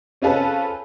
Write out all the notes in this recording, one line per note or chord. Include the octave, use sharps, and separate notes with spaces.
C4 C#4 F4 G#4 A4 B4